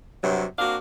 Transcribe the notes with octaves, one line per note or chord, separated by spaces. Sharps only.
G2 C3 F#3
A#3 C4 D4 F#4 F5